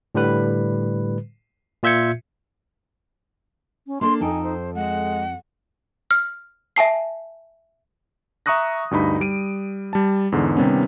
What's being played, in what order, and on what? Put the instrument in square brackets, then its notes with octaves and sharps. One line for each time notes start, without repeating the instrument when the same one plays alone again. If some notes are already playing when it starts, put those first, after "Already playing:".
[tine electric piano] A2 D3 G3 B4
A#2 F4 E5 G6 G#6 C#7
[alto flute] C#4
[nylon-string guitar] A#3 D4 A4 [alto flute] C6
[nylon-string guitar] F2 A4 G5 [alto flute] D#4 [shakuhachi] G#5
[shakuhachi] C5
[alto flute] G#3 [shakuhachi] F#5
[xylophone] F6
E5 G#5 A5 C7
[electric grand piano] E5 A#5 C#6 D#6 F#6 A#6
D2 G2 D#4 B5
G3 D7 D#7
G3 A5
E2 G#2 D3
C3 D#3 G3 B3 C#4